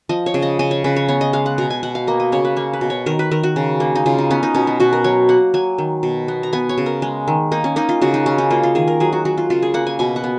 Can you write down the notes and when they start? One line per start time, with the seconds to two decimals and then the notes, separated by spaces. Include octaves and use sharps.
0.09 F3 D#5
0.26 C#5
0.34 C#3
0.42 D#5
0.59 C#3 D#5
0.71 C#5
0.84 C#3 B4
0.96 C#5
1.08 B3 C#5
1.21 D#5
1.33 G#3 F5
1.46 F#5
1.58 B2 A#5
1.70 G#5
1.83 B2 F#5
1.95 F5
2.07 A#3 D#5
2.20 D#5
2.32 C#3 C#5
2.45 B4
2.57 A#3 C#5
2.73 B4
2.81 B2
2.90 C#5
3.06 D#3 A#4
3.19 B4
3.31 D#3 A#4
3.43 F#4
3.56 C#3
3.80 A#3
3.95 D#4
4.06 C#3 F4
4.18 D#4
4.31 B3 C#4
4.43 D#4
4.54 B2 C#4
4.67 B3
4.80 B2 F#4
4.93 A#4
5.04 F#3 C#5
5.29 A#3 F#5
5.54 F#3 G#5
5.78 D#3
6.03 B2
6.28 B3
6.43 A#5
6.53 B3 G#5
6.69 C#5
6.78 C#3
6.86 A#4
7.02 G#3
7.28 D#3
7.52 A#3 D#4
7.64 C#4
7.76 A#3 D#4
7.89 F4
8.01 C#3 F#4
8.14 D#4
8.26 C#3 C#4
8.38 D#4
8.51 A#3 F4
8.63 F4
8.75 D#3 G#4
8.88 A#4
9.00 F#3 G#4
9.13 F#4
9.25 F#3 F#4
9.37 F4
9.50 C#3 F4
9.62 G#4
9.74 A#3 F#5
9.87 G#5
9.99 B2 G#5
10.16 F#5
10.24 B3